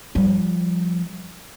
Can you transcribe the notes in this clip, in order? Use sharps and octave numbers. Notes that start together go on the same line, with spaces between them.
F3 G3